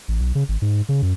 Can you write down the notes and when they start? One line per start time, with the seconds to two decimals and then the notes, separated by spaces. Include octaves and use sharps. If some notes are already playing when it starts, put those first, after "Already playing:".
0.08 A1
0.21 B1
0.35 C#3
0.49 G#1
0.62 G#2
0.89 C#3
1.02 F#2